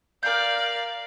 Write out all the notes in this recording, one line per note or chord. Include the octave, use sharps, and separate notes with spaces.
A#4 D5 F5 G6